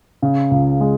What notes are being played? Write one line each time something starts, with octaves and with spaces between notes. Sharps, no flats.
C#3
C#2
G#3